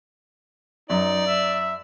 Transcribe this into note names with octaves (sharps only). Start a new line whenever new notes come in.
F#2 D#4 D5
E5